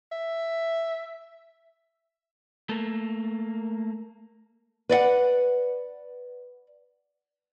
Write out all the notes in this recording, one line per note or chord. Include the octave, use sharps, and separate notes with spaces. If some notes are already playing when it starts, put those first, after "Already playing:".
E5
A3 A#3
B4 D5 D#5 F#5